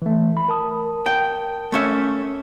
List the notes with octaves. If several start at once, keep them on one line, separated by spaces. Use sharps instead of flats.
E3 A3
B5
A#4 A5 D#6
G5
A3 C#4 E5